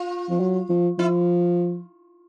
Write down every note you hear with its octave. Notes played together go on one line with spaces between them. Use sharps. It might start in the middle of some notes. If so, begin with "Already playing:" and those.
Already playing: F4
F3
F#3
F3
F3 E4